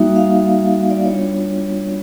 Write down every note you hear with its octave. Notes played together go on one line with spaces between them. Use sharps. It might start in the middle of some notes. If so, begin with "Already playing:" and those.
Already playing: G3 A#3 D#4 F#4 E5
F5
E5
D5
G3 B3 D4 F4 C#5